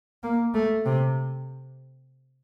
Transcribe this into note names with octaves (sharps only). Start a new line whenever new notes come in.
A#3
A3
C3